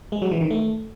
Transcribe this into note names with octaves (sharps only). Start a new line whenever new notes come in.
G#3
F#3
E3
D#3
A3